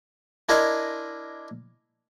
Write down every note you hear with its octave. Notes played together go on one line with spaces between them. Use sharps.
D4 E4 A#4 D#5 G#5 C6